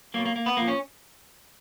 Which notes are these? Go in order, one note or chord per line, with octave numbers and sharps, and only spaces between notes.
B2 F#3 A#3
A#3
A#3
B3
A#2 F3 A#3
C#4